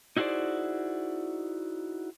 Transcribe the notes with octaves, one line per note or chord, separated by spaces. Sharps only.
D#4 E4 F#4 G#4 C5 D5